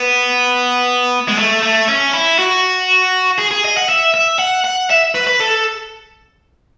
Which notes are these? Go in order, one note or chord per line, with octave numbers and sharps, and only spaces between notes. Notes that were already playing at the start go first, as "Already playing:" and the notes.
Already playing: B3
G#3
A3
A3
C#4
E4
F#4
G#4
G#4
D#5
F#5
E5
E5
F#5
F#5
E5
B4
B4
A4